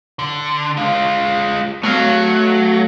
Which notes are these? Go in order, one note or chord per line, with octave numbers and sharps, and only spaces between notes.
D3
G#3 F4
F#3 A3 F5